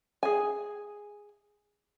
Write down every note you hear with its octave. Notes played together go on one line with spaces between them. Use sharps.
G#4 G#5